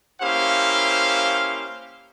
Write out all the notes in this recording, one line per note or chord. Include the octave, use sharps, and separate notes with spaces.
A#3 C#4 E4 G4 C5 F5